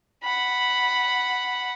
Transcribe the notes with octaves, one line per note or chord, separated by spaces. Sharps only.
F#5 B5